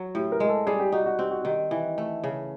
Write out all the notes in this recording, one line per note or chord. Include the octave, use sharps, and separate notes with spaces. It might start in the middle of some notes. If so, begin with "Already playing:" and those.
Already playing: F#3
A2 G4
A#4
G#3
A4
G3 G#4
G4
D#4 F#4
F#4
C4 G4
F#4
D#3 G4
E3
A3
C#3